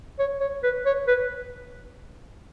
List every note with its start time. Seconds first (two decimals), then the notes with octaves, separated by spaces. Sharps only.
0.19 C#5
0.41 C#5
0.63 B4
0.86 C#5
1.07 B4